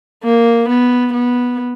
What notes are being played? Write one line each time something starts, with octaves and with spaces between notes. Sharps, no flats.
A#3
B3
B3